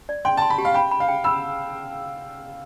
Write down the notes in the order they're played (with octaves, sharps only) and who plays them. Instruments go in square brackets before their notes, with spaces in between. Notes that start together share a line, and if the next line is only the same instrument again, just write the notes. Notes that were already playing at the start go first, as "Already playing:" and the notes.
[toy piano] D5
[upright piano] G5 [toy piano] C6
[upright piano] A5
[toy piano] C6
[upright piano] B5
[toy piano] G4
[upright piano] F5
[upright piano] G5 [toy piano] B5
[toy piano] B5
[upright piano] F5
[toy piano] G5
[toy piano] B5 [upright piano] E6